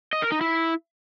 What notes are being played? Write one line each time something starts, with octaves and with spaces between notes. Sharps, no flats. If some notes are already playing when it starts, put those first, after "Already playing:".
D#5
A#4
D#4
E4